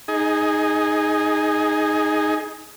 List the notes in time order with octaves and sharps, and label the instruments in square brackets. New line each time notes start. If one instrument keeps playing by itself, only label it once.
[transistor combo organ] D#4 G#4